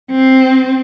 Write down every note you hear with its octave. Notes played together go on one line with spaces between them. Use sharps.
C4